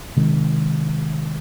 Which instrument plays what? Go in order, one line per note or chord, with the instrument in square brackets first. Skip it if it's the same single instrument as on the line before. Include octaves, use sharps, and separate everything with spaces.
[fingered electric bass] C3 D#3 G#3